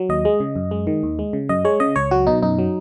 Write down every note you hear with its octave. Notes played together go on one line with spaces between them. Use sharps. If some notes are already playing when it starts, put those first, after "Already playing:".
Already playing: F#3
D#2 D#5
G#3
C#3
F#2
G#3
D#3
D#2
G#3
C#3
F#2 D#5
G#3 C#5
C#3 D#5
C#2 C#5
F#3 F#4
B2 D#4
F#2 D#4
F#3